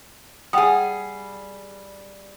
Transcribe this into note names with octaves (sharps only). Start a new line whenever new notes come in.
G3 G#4 F#5 G5 D#6